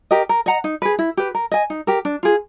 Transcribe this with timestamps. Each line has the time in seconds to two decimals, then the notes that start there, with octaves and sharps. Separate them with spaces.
0.11 G4 A#4 D#5
0.29 A#4
0.46 D#5 F#5 A#5
0.64 D#4
0.82 G#4 B4
0.99 E4
1.17 G4 B4
1.35 A#4
1.51 D#5 G#5
1.70 D#4
1.87 G4 A#4
2.05 D4
2.23 F4 G#4